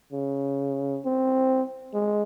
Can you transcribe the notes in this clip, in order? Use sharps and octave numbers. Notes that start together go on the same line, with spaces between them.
C#3
C4
G#3